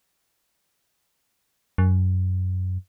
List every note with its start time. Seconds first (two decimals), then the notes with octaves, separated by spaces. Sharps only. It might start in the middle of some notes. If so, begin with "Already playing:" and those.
1.78 F#2